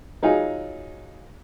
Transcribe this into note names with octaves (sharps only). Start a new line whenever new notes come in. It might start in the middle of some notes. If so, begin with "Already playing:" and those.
F#3 D#4 F4 G#4